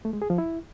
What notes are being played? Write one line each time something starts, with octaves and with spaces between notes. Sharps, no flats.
A3
G#3
G#4
F3
E4